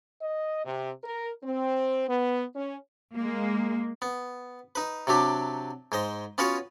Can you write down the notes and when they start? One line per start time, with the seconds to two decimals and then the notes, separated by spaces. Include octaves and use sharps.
0.21 D#5
0.65 C3
1.04 A#4
1.43 C4
2.09 B3
2.55 C#4
3.15 G#3 A#3
4.02 B3
4.75 D#4 B4
5.07 C3 F#3 D4 G4
5.92 G#2 C5 D#5
6.38 B3 C#4 F4 F#4 B4 C#5